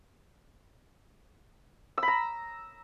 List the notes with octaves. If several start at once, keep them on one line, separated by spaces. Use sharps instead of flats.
E6
B5
A#5